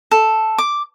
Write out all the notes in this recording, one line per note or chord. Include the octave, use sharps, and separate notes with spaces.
A4
D6